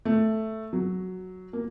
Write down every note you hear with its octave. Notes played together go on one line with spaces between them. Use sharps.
A3
F#3
A#3